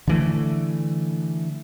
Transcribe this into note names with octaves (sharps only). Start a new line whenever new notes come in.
D3 E3 A3